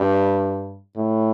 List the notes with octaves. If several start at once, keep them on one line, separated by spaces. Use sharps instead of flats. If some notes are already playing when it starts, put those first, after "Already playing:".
Already playing: G2
A2